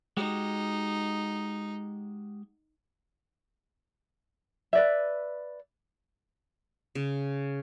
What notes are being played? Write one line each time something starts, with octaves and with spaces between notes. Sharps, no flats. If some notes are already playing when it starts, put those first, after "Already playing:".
G#3 D#4 F#4 G4
B4 D5 E5
C#3